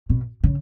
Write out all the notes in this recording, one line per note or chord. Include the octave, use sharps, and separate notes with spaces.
B2
C#3